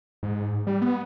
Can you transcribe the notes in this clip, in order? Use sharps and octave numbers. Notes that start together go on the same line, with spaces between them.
G#2
G3
B3